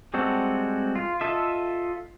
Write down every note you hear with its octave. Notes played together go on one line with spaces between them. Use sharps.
G3 G#3 C4 F#4 A4
F4
F4 A4 D#5 E5